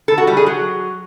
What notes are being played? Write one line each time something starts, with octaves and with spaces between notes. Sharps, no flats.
A4
F#4
G3
G#4
F#3